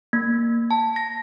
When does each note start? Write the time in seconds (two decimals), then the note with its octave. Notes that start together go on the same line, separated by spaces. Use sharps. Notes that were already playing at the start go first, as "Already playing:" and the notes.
0.13 A#3
0.71 A5
0.96 A#6